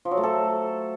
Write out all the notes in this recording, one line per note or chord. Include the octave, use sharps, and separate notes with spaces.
F3
F#3
A3
A4